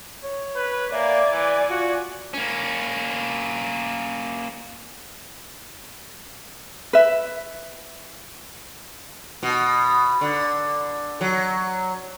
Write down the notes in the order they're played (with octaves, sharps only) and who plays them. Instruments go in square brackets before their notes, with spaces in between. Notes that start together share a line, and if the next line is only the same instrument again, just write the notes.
[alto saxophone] C#5
[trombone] B4
[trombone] A#3 [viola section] D5 G#5 [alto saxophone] E5
[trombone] E3
[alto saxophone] F4 [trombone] F#4
[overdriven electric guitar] A#3 C#4
[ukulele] B4 E5
[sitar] B2
D3
F#3